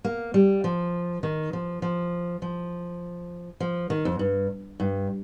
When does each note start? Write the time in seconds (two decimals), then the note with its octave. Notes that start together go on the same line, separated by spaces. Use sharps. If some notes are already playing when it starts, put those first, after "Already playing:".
0.04 A#3
0.34 G3
0.64 F3
1.23 D#3
1.53 F3
1.82 F3
2.42 F3
3.60 F3
3.90 D#3
4.05 F2
4.19 G2
4.80 G2